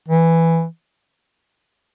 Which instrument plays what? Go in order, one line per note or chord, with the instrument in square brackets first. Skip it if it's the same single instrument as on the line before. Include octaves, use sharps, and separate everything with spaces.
[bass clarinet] E3